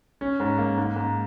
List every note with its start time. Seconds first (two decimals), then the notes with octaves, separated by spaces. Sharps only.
0.21 C#4
0.40 G#2
0.58 A#3
0.78 G#2
0.96 G#2